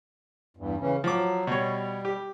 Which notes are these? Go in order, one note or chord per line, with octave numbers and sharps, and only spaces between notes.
E2 G2
C#3 E3 C#4
F3 F#3 D6
B2 G3 C#5
G4